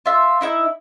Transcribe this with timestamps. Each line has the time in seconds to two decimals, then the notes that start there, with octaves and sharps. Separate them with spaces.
0.06 F4 E5
0.41 D#4 E4 E5